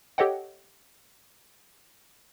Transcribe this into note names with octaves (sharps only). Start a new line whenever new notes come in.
G4 A4 C#5 D#5 F#5 G5